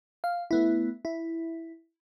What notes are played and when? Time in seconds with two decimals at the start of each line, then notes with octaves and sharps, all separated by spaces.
0.24 F5
0.51 A3 B3 E4
1.05 E4